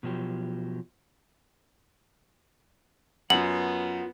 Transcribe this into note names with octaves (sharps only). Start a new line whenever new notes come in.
B2 F3 F#3 G4
F#2 B3 F4 F#5 F#7